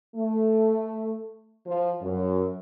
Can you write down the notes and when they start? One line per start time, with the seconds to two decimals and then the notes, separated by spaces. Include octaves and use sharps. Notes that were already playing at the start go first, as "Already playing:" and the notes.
0.15 A3
1.66 F3
2.02 F#2